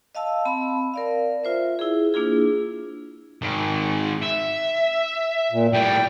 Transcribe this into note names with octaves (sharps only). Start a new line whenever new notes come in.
D#5 F5 A5 E6
C4 A5 B5
A#4 D5 F5
F4 C5 E5
E4 G#4
A#3 D4 E4 F4 G#4
G#2 D#3
E5
A#2
A2 G3 G5